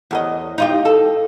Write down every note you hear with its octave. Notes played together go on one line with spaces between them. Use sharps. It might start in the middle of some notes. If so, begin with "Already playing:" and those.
E2 A4 D#5
D#4 F4 G4
A4